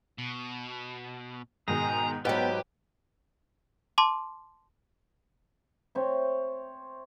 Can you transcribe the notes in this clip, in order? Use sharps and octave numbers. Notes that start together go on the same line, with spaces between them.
B2
G#2 B2 D#3 G#4 A#5
G#2 F#3 B3 G4 B4 G5
A5 C6 D6
C4 C5 C#5 E5